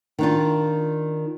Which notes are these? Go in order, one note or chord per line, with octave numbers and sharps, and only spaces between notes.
D#3 D4 F4